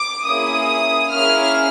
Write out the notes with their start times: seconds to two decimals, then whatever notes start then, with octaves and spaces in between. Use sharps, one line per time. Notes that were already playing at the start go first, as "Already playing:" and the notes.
Already playing: D6
0.25 A#3 C#4 E4 G#4 D#6
1.12 A#3 C#4 E4 G#4 F6